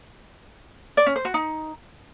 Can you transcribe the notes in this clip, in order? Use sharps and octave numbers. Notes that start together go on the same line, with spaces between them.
D5
C#4
C5
F#4
D#4